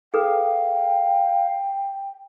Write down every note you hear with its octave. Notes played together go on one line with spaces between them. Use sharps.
G#4 A4 B4 F5 G5